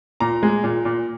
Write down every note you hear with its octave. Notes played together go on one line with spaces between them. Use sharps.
A#2 A#5
G#3
A#2
A#2